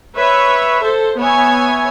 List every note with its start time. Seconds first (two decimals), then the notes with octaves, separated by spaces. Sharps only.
0.16 B4 C#5 E5
0.84 A4 C5
1.18 B3 C#5 E5 G#5